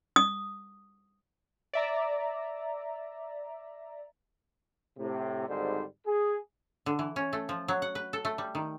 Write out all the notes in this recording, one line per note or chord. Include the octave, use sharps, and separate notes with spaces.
D#6
D5 E5 A#5
A2 C3
G#1 G#2 D3 G3 C5
G#4
D3
E3
C#4
A3
F3
F#3
F#5
B4
A4
A3
G3
D#3